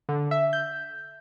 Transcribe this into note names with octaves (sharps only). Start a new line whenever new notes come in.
D3
E5
G6